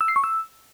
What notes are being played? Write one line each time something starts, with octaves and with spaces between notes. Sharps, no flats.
E6
C7
C#6
E6